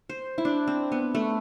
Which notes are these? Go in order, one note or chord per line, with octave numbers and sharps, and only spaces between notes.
C5
E4
D4
C4
B3
A3